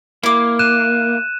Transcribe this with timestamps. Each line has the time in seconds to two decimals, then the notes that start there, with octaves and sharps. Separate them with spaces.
0.23 A#3 E4 D6
0.59 F#6 D#7 E7